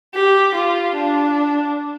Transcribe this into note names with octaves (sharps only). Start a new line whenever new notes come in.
G4
F4
D4